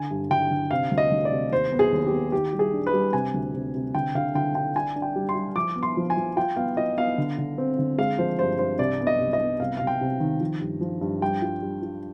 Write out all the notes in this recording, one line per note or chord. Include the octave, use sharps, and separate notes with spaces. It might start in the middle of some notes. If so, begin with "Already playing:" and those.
Already playing: D3 G#5
G2
D3 G5
D3
C3 F5
D2
D#5
D2
D5
C3
D#2 C5
B3
G#4
D#2
G4
B3
D#3 G4
G3
G#4
D4
B4
G3
C3 G#5
D2
C3
C3
D3 G5
D3 F5
D3 G5
D4 G5
D4 G#5
D4
G5
G3
C6
G3
F3 D6
B3
C6
F3
G#5
F3
F4 G5
B3 F5
F4 D#5
B3 F5
D3
D3
C4
D3
G#3 F5
F3 C5
G2 C5
G2 C5
C2 D5
B3
D#5
C2
D#5
B3
C2 F5
C2 F5
G5
C3
D#3
F3
G2
F3
G2
G3 G5
F4
G3
F4